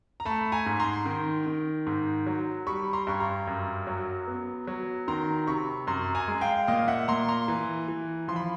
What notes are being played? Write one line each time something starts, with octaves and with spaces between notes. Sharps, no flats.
A#5
A3 A5 B5
G#5 A#5
G#2
A#5 C6
D#3
D#3
G#2
F#3
G3 B5 C#6
A#5 C6
G2 C#6
A#5 C6
F#2
F#3
B3
F#3
D#3 A#5 C6
C3 B5 C#6
F#2 A#5 C6
G#5 A#5
G#3
F5 G5
A#2 D#5 F5
E5 F#5
A#2 A#5 C6
A#5 C6
E3
E3
F3 C6
B5